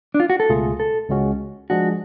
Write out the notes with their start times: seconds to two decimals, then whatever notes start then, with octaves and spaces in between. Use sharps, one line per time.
0.14 D4
0.20 F4
0.30 F#4
0.40 A4
0.49 C#2 B2 A3 F4 G#4
0.80 A4
1.10 C#2 C#3 G#3 C#4 F#4
1.70 F3 G#3 D4 F#4 G#4